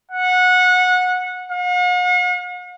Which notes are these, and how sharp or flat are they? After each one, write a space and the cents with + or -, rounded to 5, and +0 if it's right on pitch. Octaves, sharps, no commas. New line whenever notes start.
F#5 -20
F#5 -45